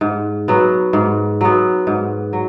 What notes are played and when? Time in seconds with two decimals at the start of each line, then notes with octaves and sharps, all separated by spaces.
0.01 G#2
0.48 F#3 B3
0.93 G#2
1.41 F#3 B3
1.87 G#2
2.33 F#3